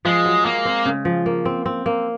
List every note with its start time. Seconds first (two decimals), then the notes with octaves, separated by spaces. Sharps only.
0.05 F3 G#3
0.25 F#3
0.45 G#3 A#3
0.65 C4
0.85 C#3
1.05 F3
1.26 A#3
1.45 C4
1.66 C4
1.86 A#3